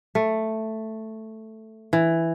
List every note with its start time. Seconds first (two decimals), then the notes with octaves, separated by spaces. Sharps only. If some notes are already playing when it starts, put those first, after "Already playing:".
0.15 A3
1.93 E3